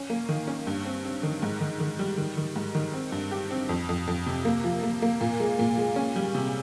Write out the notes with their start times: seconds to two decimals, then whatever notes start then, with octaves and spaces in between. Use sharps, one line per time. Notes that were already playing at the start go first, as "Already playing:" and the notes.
Already playing: C#4
0.10 A#3
0.29 D#3
0.48 C#4
0.67 G2
0.85 C4
1.05 C4
1.23 D#3
1.42 G#2
1.61 D#3
1.80 D#3
1.99 G3
2.18 D#3
2.37 D#3
2.56 G#2
2.75 D#3
2.93 C4
3.12 G2
3.31 G4
3.51 C4
3.69 F2
3.89 F2
4.07 F2
4.26 C3
4.45 A#3
4.64 F3
4.83 A#3
5.02 A#3
5.21 A#2
5.40 G#3
5.59 A#2
5.78 G#3
5.96 C#4
6.16 G3
6.35 C3